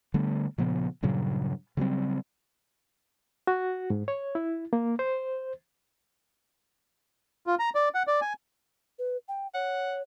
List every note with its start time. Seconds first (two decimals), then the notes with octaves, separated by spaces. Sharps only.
0.14 D3 G3 A3 B3
0.58 A#2 C#3 F3 B3
1.03 G2 A#2 C#3 F#3
1.77 C#3 F#3 G3 C4
3.47 F#4
3.90 G#2
4.08 C#5
4.35 E4
4.73 A#3
4.99 C5
7.47 F4
7.59 A#5
7.75 D5
7.95 F#5
8.07 D5
8.21 G#5
8.99 B4
9.28 G5
9.54 C#5 F#5